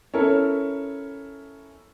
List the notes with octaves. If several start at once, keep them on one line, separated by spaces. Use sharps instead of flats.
C#4 E4 A4 A#4